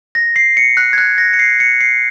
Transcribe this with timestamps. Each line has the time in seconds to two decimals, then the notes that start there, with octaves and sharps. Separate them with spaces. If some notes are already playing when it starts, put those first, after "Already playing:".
0.15 A#6
0.36 C7
0.57 C#7
0.77 F#6
0.93 G#6
0.98 F#6
1.18 A#6
1.33 C#7
1.39 C7
1.60 C#7
1.81 C7